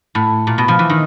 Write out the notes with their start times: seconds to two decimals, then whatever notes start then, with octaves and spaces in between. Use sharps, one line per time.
0.15 A2
0.47 A#2
0.58 B2
0.68 F3
0.79 E3
0.90 D#3